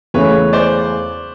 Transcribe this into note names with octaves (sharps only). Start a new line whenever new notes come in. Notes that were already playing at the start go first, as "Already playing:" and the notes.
E2 C#3 E3 A3 C#4 B4 C#5
C5 D5